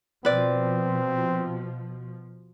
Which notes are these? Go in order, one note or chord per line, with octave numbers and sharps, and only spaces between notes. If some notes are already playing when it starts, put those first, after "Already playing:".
B2 F3 C4 B4 D5